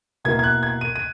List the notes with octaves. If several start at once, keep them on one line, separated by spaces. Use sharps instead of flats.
B2 A#3 E4 G#6
G#6
F#6
G#6
D#7
D#7